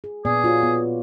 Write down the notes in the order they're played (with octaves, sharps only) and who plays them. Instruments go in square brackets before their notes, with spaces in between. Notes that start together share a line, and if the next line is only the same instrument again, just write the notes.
[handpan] G#4
[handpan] A#2 B3 D5 [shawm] G#4
[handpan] F4 F#4 C#5
B3